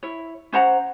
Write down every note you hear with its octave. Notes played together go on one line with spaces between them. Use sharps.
E4 C#5
C#4 C5 F#5 A#5